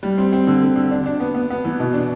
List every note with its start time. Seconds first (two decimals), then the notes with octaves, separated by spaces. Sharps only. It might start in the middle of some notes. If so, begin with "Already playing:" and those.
0.03 G3
0.18 C4
0.32 C4
0.47 D3
0.62 D3
0.76 D3
0.91 D4
1.06 D4
1.20 B3
1.34 B3
1.50 B3
1.65 E3
1.80 B2
1.93 D4